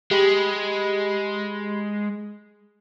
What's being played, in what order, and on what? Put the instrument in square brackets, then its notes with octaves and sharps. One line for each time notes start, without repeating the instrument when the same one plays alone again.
[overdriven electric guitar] G#3 [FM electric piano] G4 B5